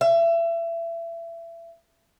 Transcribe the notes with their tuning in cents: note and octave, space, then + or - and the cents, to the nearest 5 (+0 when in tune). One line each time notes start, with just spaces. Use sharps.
E5 +30